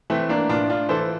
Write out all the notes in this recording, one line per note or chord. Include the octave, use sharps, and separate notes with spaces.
E3 A3 C4
A#3 D4
A2 D4 F4
D4 F4
E3 A4 C5